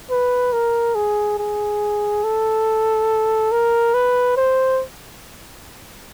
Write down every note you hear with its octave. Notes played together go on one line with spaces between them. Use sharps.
B4
A#4
G#4
G#4
A4
A#4
B4
C5